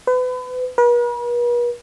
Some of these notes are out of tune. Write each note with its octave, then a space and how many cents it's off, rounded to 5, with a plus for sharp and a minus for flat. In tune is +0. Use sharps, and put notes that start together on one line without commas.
B4 +35
B4 -45